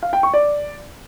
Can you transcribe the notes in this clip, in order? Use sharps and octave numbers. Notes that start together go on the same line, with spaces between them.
F5
G5
C#6
D5